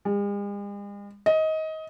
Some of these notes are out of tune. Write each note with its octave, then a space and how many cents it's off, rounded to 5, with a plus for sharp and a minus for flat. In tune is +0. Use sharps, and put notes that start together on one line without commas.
G#3 -45
D#5 +20